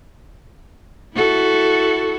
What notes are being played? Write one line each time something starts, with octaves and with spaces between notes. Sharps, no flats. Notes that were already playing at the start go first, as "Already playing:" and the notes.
E4 F#4 A4